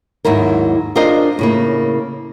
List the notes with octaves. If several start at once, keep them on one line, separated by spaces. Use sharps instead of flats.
D#2 G#2 F#3 E4 A#4
D4 F4 G#4 A#4 C5 D#5
A2 C#3 A#3